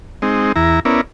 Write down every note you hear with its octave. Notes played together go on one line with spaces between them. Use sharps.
G#3 C4 D#4
E2 E4 A#5
B3 C#4 E4 A#4 D5